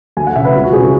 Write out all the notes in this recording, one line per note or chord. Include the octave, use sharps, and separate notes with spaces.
D2 G#5
F#5
C#3 E3 E5
B4
C#2
F#4
C#3 E3 G#4
F#4